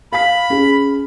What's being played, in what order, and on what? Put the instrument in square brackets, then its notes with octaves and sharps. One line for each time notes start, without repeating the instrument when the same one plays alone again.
[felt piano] F5 B6 [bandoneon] B5
[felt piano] C#4 G#4